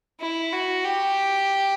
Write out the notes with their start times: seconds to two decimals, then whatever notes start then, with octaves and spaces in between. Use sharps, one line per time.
0.20 E4
0.52 F#4
0.85 G4